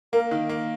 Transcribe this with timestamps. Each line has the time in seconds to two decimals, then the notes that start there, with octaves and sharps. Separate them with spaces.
0.13 A#3 A#4
0.31 D#3
0.49 A#3